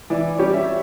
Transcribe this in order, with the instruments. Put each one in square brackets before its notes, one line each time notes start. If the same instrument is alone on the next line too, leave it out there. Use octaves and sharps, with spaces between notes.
[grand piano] E3 [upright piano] D5
[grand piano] G3 C#4 G4 [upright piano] C#5
[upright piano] E5